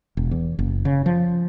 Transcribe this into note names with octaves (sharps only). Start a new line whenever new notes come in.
E1
E2
F#1
C#3
F3